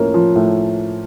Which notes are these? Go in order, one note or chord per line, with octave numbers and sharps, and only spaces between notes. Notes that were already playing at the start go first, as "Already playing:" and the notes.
Already playing: A2 F3 A#3 C#4
F3
A2